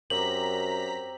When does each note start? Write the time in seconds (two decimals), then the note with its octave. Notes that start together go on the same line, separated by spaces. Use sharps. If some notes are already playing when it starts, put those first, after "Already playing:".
0.10 F#2 C4 G4 A#5 B6 F#7